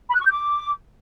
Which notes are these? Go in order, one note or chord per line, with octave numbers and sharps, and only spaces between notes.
B5
F#6
C#6
G6
D6